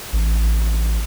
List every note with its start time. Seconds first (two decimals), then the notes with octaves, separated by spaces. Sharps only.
0.13 A1